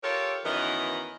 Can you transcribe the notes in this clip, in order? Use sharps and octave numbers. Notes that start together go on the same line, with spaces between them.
F4 G4 A4 A#4 C#5
F#2 D#3 E3 B3 A#4 D#5